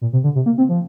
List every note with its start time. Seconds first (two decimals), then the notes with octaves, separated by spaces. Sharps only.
0.01 A#2
0.13 C3
0.24 D3
0.35 C3
0.46 A#3
0.58 C4
0.69 F3